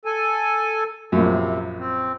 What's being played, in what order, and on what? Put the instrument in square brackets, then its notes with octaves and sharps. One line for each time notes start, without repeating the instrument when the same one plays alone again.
[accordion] A4 G#5
[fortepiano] A#1 F#2 [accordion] C3
[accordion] C4